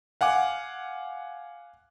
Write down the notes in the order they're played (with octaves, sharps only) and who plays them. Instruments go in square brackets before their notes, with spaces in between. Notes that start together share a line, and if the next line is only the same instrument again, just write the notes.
[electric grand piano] F5 F#5 G#5 D6